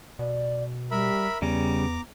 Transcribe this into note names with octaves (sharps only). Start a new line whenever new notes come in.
B2 D5
G3 A#4 E5 B5
E2 C#3 G3 B3 A#5 D6